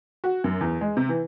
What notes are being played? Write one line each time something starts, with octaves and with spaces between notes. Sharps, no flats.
F#4
F#2
E2
G#3
C3
E3